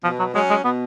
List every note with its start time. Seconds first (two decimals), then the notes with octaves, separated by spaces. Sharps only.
0.04 B2 F3
0.19 F#3
0.34 F#3 G#3 C#4
0.50 G#3
0.65 B2 B3